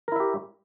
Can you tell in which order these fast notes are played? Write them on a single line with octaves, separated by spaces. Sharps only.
A#4 E4 E5 G4